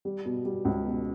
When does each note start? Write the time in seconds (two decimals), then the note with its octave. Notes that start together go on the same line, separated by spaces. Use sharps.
0.05 G3
0.25 B2
0.45 G3
0.65 C#2
0.85 B2